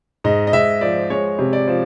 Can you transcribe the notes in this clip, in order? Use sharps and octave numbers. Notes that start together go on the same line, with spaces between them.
G#2 D#5
D#5
G#2 E5
F3 D5
G#3 C#5
C3
D5
F3